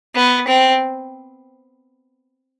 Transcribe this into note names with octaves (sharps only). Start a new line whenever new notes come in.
B3
C4